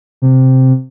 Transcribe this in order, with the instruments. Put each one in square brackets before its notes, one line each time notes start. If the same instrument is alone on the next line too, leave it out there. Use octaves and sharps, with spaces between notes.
[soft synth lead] C3